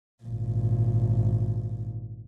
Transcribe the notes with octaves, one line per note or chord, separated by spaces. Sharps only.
G#1 A#2